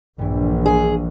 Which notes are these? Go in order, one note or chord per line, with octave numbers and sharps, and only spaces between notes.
A#1 G2 E3
G#4